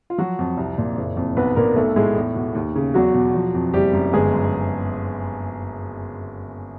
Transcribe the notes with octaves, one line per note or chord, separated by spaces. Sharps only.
F4
F3 F#3 F#4
F2
C2
A#2
F#1
F2
B1 B3 B4
A#2 A#3 A#4
B1 A3 A4
A2 G#3 G#4
E2
B2
D#2
C#3
E2 F#3 F#4
B2
F3
F2
F#1 G3 G4
F#2
G1 G#3 G#4
F#2